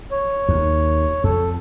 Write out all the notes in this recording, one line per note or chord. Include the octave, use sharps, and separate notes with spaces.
C#5
D#2
F2 A4